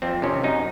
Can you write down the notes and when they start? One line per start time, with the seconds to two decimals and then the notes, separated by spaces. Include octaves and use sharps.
0.02 F2 C4
0.22 C3 D#3 C#4
0.44 F#2 D#4